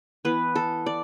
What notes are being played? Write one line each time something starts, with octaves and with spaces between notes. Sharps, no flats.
E3 B3 B4
A4
D5